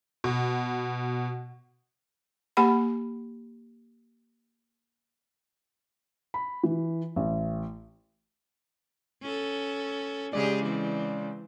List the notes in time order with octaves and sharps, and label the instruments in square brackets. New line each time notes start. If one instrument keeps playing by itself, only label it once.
[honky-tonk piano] B2
[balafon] A#3 G4 F#5 B5
[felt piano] B5
E3
A1
[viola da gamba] C#4 A4
[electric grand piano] C#3 G#3 D5 [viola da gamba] G4 G#4
[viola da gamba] E3 C4